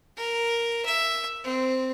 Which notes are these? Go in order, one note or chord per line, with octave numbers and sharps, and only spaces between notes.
A#4
E5
C4